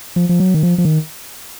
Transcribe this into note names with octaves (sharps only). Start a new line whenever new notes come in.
F3
F3
F#3
D#3
F3
F3
D#3